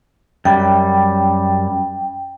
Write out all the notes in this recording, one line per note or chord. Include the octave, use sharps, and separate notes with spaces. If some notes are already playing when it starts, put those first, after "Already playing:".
F#2 G3 G5